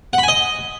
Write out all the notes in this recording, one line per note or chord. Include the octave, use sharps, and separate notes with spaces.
F#5
B5
G#5
D#5